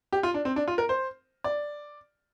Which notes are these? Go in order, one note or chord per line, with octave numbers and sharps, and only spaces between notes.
G4
F4
D4
C4
D4
F4
A#4
C5
D5